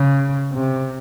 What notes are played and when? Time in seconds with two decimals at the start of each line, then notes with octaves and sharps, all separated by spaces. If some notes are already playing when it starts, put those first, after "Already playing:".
Already playing: C#3
0.53 C3